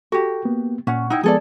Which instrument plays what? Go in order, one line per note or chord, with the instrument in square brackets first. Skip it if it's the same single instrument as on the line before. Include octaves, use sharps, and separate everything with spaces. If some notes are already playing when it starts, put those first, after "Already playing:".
[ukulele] F#4 G4 [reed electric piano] A4
[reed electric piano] A#3 B3
[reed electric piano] A#2 F#5 C#6 [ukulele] C#4
[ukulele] D#4 E4 [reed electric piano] F#5 G5
[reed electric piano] F3 G#3 B3 [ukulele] G#4 A4 D5